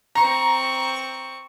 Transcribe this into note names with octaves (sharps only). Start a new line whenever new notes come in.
C4 A#5 C#6